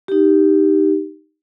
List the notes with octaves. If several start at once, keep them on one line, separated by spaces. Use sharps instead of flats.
D#4 G4